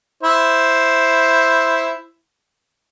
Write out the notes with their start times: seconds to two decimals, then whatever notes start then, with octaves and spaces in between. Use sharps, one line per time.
0.23 E4 C5